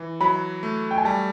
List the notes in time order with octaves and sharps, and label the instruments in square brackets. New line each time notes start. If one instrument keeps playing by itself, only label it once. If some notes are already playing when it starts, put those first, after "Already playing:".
Already playing: [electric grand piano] E3
[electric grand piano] F#3 [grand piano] B5
[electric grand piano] A3
[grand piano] G5
G#5
[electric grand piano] G3 [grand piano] A5